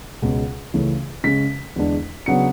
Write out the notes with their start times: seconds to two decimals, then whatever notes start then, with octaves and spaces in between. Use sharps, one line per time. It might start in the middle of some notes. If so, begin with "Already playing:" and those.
0.22 C#2 B2 G#3
0.73 C#2 C#3 E3 A3
1.24 C#3 G#3 C#4 B6
1.76 E2 D3 G#3 D4
2.26 C#3 F#3 B3 D4 C#7